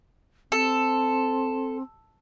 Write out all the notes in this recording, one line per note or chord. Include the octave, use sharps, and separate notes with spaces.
C4 A4